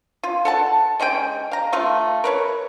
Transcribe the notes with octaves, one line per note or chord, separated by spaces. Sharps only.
F4
A4 F#5 A5
G#3 C#4 G#4 G5
F5 A#5
A3 F4 F5
A#4 B4 C#5